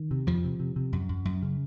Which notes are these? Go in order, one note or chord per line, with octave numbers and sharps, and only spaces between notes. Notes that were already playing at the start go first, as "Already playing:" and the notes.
Already playing: D#3
C3
F2 F3
C3
C3
C3
F#2
F#2
F#2
C#3